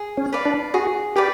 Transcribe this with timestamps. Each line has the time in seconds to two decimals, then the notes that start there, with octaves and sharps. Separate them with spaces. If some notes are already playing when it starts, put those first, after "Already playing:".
Already playing: G#4
0.17 C#4
0.33 B4 D5 F5
0.45 D4
0.74 F#4 G#4
1.16 G4 B4 D5 F5